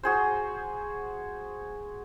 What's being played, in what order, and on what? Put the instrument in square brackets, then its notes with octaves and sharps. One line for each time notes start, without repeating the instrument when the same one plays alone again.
[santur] F#4 G#4 C5